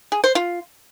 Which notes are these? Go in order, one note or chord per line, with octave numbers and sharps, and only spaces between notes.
G#4
C5
F4